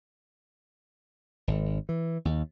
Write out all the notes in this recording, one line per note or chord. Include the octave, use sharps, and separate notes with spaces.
G#1
E3
D#2